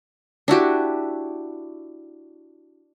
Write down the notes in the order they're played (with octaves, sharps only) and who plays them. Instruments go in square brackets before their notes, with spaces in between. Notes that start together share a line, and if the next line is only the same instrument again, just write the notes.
[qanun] D4 E4 F#4 G4